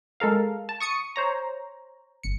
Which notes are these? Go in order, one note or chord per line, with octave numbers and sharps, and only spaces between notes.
G#3 A4 A#4 F5
A5
C#6 D#6 C#7
C5 C#5 A#5
G1 C#7